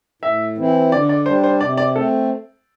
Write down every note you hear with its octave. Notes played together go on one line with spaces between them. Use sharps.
A2 E5
E3 C4 E4
D3 D5
D5
G3 D4 C5
C5
C3 D5
D5
A3 C4 A4